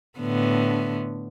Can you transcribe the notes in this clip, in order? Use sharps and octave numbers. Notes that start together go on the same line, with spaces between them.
A2 D3 B3